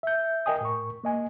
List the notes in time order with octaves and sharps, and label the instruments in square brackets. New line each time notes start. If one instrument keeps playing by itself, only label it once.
[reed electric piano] E5 G6
A#4 D#5 G5 G#5 D#6
A2 A#4 C#6
A#3 D#5 G#5